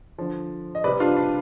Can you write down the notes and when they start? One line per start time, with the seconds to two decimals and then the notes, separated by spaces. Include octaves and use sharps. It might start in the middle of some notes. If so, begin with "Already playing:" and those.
0.18 D3 F3
0.75 D#5
0.84 C3 G3 B4 D5
1.00 D4 F4
1.17 D4